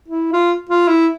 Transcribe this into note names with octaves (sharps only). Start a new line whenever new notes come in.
E4
F4
F4
E4